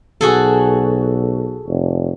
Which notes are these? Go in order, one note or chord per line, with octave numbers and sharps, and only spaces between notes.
B1 F#4 G#4 A4
F1